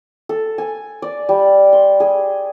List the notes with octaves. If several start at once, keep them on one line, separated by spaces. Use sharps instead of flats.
A4
G#5
D5
G3
C6
G#4